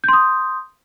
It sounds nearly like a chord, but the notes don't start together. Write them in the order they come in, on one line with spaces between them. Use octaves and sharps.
G6 C6 D#6